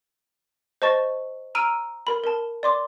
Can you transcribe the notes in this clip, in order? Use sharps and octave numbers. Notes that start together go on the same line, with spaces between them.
C5 D#5 A5 C#6 A6
A#5 E6 F6 D7 D#7
A#4 B5
A#4 A5
D5 C6 D6